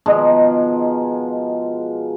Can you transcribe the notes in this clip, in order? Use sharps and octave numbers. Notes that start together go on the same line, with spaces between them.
B2 D#3 F3 G#3